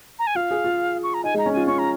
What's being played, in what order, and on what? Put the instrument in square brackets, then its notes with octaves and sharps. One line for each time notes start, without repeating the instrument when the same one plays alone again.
[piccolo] A#5
G#5
[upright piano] F4 [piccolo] F5
[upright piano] G#4
F4
[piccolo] C#6
A#5
[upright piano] D#4 [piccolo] G#5
[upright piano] G#3 [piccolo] A#5
[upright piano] C#4
[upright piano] F4 [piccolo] G#5
[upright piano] C#4 [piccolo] C#6
[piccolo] A#5